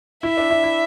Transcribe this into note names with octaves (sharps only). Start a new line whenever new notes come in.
E4 E5
D4
E4
E4